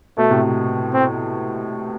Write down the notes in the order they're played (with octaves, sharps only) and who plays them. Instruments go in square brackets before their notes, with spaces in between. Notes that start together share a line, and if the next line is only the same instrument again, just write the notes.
[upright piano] B2 [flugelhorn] A3
[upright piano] A2 C3
[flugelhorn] C4